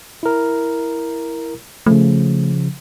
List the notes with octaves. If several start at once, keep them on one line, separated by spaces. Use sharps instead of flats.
E4 A#4
C#3 F3 A3